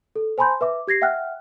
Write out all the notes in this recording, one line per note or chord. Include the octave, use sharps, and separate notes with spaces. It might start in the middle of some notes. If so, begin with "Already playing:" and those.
A4
C5 G#5 A5 B5 C6 G6
B4 E5 D6
G4 G#6 A#6 C7
E5 F#5 G5 F6 F#6